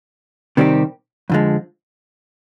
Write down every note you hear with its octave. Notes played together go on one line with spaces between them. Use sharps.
C3 D#3 G3 C4 G4
F2 D3 F3 G#3